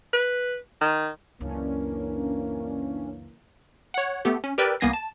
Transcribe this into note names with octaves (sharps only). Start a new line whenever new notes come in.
B4
D#3
C#2 F#2 E3 A#3 C#4 D4
C#5 F#5
A3 B3 G4 A4
C#4
G4 A#4 B4 D5 G5 E6
C2 A#3 B3 G#5 A#6 C7
A5